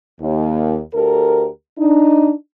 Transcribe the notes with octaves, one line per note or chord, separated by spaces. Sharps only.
D#2
D2 G4 A4 A#4
D4 D#4